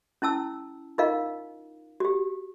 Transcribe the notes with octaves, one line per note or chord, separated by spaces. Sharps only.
C#4 E4 A5 E6
D#4 F4 A#4 D#5 F5
F#4 G4